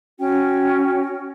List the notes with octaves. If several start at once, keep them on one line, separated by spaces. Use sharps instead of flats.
C#4 F#4 G5